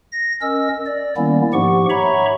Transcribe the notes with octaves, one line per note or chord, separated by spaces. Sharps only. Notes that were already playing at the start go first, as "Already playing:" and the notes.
A#6
C#4 A#4 D#5 E6
D5
D#3 G3 A#3 B3 C#4 E4
G#2 F3 G4 F#5 C#6
C#5 E5 A#5 B5 C#6